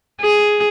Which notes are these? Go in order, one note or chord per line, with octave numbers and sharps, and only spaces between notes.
G#4